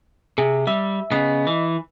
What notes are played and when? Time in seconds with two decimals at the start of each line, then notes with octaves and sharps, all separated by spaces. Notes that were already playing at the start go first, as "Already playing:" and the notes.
0.38 C3 G#4
0.67 G3 E5
1.12 C#3 B3 D#5
1.47 E3